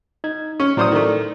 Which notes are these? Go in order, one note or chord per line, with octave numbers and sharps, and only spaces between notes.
D#4 G#6
C#4 C#6
A2 F#3 C5 D5 D#6 F6
D#3 A3